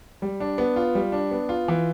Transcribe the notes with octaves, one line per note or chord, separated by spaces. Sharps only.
G3
D4
B3
F4
G3
D4
B3
F4
E3